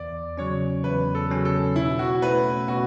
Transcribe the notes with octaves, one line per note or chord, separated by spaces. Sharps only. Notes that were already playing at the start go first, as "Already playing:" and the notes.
Already playing: E2 D5
C#3 F#3 C#4 C#5
E2 B4
A4
C#3 F#3 C#4
A4
B2 E4
F#4
A3 C#4 E4 B4
B2 F#4